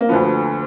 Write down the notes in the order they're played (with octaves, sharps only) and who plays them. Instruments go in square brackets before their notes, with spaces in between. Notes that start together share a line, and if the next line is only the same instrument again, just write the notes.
[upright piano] A#3
D2 D3 F3 B3